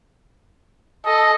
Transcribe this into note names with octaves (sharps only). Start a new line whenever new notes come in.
A4 D#5